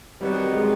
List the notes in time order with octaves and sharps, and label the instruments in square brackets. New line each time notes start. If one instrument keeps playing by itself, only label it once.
[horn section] C3 D#3 F#3 B3 D#4 [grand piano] G3
[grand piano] G#3